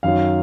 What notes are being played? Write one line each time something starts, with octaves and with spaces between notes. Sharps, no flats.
F#2 D#3 F#3 F5